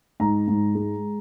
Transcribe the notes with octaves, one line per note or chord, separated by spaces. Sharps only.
G#2 A#5
G#2
G#3